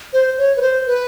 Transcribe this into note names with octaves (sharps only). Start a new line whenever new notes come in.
C5
C#5
B4
C5
B4